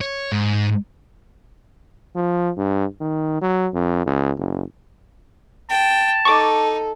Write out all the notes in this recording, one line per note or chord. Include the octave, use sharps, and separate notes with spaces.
C#5
G#2
F3
G2
D#3
F#3
F2
C#2
F#1
G5 A5
D#4 A4 C#6 D6